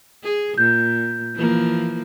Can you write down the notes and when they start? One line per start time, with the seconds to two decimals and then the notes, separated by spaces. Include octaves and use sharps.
0.23 G#4
0.58 A#2 G6
1.35 E3 F3 A#3